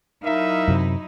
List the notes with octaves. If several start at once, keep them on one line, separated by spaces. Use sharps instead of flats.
F#3 D#4 E4 A#4 E5 F5
F#2 C3